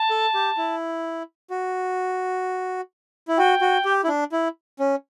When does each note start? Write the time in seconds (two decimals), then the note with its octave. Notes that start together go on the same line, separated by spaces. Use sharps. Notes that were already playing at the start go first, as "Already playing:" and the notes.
Already playing: A5
0.10 A4
0.34 G4
0.57 E4
1.50 F#4
3.28 E4
3.37 F#4 G5
3.61 F#4
3.85 G4
4.04 E4
4.08 D4
4.32 E4
4.79 C#4